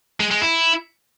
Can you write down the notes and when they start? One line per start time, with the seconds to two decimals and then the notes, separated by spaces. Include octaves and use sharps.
0.20 G#3
0.31 G#3
0.42 E4